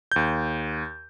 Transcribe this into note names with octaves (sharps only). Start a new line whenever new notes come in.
D#2 G6